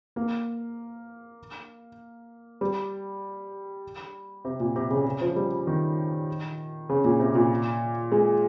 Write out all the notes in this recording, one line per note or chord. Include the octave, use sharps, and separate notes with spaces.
A#3
G3
C3
A#2
C3
C#3
C#3
F3
G3
D#3
C#3
A#2
C3
A#2
G#3